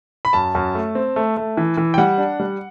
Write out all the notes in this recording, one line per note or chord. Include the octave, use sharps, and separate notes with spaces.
B5
F#2 A5
F#2
A3
C4
A3
A3
E3
E3
G5
G3 F#5
D4
G3